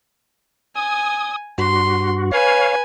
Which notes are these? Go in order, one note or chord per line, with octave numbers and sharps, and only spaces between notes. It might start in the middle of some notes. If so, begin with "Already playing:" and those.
G#5 D#6
G2 F#4 C6
B4 C#5 F5 G#5